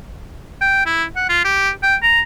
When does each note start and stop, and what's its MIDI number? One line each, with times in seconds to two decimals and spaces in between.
0.61 0.86 79
0.86 1.04 64
1.16 1.28 78
1.29 1.45 65
1.45 1.70 67
1.83 1.96 79
2.03 2.21 82